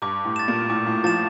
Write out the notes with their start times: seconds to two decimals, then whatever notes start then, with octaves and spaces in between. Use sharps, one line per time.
0.02 G2 D6
0.25 A2
0.36 A6 E7
0.48 A#2
0.70 A2 D6
0.86 A2
1.04 F3 A6 E7